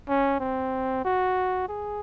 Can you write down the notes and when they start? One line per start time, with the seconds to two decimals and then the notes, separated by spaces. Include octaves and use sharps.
0.09 C#4
0.40 C4
1.05 F#4
1.68 G#4